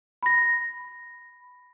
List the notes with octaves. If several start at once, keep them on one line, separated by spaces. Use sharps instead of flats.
B5 A#6